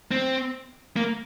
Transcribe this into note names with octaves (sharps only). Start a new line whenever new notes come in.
C4
A#3